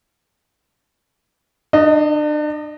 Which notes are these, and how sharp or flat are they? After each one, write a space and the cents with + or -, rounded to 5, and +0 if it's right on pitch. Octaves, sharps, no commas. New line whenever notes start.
D4 +40 D#5 +0